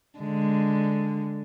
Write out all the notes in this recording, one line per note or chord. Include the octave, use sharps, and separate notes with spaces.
D3 G#3